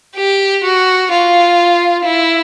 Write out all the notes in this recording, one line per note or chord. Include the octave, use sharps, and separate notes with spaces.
G4
F#4
F4
E4